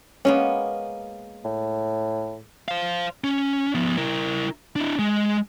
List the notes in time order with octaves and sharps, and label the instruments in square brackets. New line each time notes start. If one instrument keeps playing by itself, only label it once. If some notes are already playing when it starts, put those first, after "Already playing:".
[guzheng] G#3 A#3 B3 [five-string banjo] C#4
[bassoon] A2
[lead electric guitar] C5 F5
C#4
F3 B3
E4 A#4
D4 E4
G#3